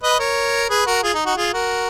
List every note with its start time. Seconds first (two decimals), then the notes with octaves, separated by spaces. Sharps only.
0.03 B4 D#5
0.20 A#4 C#5
0.70 G#4 B4
0.86 F#4 A#4
1.03 F4 G#4
1.14 D#4
1.26 D#4 F#4
1.36 F4 G#4
1.53 F#4 A#4